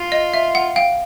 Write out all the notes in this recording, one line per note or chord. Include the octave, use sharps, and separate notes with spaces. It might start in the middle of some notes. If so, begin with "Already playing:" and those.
Already playing: F4
D#5
E5
F#5
F5 G5